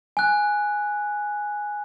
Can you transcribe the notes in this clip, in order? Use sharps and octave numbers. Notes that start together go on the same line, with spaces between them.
G#5 F#6